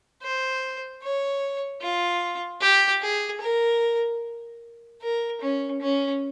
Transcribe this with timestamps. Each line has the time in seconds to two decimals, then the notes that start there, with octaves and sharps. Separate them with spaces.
0.22 C5
1.02 C#5
1.81 F4
2.61 G4
3.02 G#4
3.41 A#4
5.02 A#4
5.41 C#4
5.81 C#4